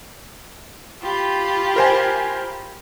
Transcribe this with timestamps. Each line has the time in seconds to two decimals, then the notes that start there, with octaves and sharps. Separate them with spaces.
1.02 F4 G4 B5
1.76 A#4 C5 G#5